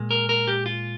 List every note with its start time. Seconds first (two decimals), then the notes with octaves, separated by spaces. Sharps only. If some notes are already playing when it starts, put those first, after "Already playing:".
Already playing: A#2 G#3
0.11 A#4
0.29 A#4
0.48 G4
0.66 F4